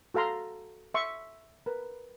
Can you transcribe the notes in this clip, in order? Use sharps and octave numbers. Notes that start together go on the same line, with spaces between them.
F#4 A4 F5 A#5 C6
E5 C6 C#6
A#4 B4